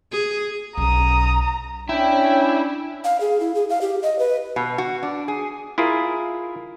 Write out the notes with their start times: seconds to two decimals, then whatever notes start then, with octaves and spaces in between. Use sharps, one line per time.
0.12 G#4
0.77 B1 C#4 A#5 D#6
1.89 C#4 D4 E4 G5
3.05 F5
3.20 G#4
3.40 E4
3.55 G#4
3.70 F5
3.81 G4
4.02 D#5
4.19 B4
4.56 B2
4.78 F#4
5.03 D4
5.28 G#4
5.78 E4 F4 G#4 A#4